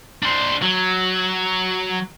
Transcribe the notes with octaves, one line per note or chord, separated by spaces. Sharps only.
D4 C5
F#3